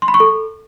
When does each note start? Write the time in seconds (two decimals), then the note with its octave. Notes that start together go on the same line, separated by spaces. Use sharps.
0.02 C6
0.08 B5
0.14 C#6
0.20 A4